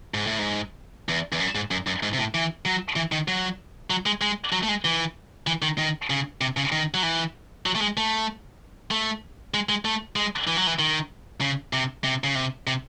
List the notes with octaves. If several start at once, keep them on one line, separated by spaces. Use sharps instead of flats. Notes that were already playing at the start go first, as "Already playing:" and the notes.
G#2
A2
G#2
E2
E2
F#2
G#2
F#2
F#2
G#2
C3
A2
E3
F#3
E3
D#3
F#3
F#3
G#3
G#3
F#3
A3
G#3
E3
E3
D#3
D#3
C#3
C3
C#3
D#3
F#3
E3
F#3
A3
G#3
A3
A3
G#3
G#3
A3
G#3
E3
F#3
E3
D#3
C#3
C3
C3
C#3
C3
C3